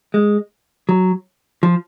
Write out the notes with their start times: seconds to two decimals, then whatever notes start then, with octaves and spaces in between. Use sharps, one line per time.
0.14 G#3
0.89 F#3
1.63 F3